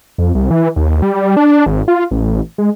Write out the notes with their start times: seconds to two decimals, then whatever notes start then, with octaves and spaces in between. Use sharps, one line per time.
0.18 F2
0.35 C2
0.51 E3
0.76 D#2
1.02 G3
1.37 D4
1.66 G#1
1.88 F4
2.11 A1
2.58 G#3